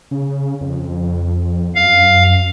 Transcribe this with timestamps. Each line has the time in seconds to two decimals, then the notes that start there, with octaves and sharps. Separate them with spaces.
0.11 C#3
0.61 F2
1.75 F#2 F5